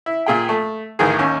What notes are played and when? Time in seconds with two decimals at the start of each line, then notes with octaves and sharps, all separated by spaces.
0.06 E4
0.26 A#2 G#4 G5
0.49 A3
0.99 A1 D2 D#3 G#4
1.19 D#2 C#4